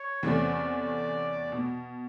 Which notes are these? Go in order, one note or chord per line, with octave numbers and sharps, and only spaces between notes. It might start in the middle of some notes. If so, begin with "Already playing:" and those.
Already playing: C#5
E2 C3 E3 A3 C#4 D5
B2